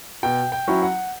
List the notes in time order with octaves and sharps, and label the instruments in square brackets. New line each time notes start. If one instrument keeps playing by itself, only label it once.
[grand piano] B2 G5
G5
F#3 C#4 E4
F#5